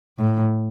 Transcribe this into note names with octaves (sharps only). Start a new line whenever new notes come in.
A2